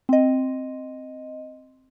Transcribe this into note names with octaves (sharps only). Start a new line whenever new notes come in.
C4 D#5